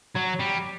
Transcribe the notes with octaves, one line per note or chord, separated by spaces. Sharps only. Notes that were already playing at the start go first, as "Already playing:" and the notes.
F#3
G3